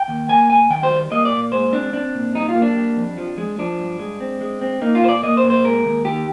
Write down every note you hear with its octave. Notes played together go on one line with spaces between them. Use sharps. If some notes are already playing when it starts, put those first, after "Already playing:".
Already playing: G5
D#2
A#3 G#5
A#2 G#5
D#3 G5
C5
G3
A#3 D#5
D5
A#2
G#3 C5
C4 D4
C4 D4
A#2
G3 D#4
F4
A#3
D4
G3
F2
F3
G#3
F3 D4
G2
G#3
C4
G#3
C4
A#3 D#4
F4
A#2 C5
D5
A#3 D#5
C5
A#2
C5
G#3 A#4
D#2
D#3 G4